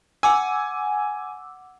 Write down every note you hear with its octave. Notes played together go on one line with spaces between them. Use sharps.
F#5 G#5 D6 E6